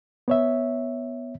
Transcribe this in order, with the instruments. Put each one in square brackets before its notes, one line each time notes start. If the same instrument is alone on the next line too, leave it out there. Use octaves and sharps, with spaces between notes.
[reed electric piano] B3 C#5 E5